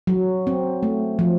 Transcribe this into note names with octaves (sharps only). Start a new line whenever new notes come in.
F#3
C4
A3
F3